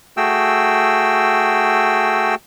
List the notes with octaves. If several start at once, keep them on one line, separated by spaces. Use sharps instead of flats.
A3 F#4 G#4 G5 E6